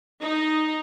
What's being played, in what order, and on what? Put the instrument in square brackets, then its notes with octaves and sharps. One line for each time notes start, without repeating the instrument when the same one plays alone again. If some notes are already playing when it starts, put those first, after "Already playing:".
[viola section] D#4